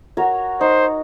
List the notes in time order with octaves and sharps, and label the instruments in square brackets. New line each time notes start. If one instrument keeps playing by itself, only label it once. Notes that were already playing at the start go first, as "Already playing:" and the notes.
[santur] F#4 A#4 C#5
[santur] D#4 [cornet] C5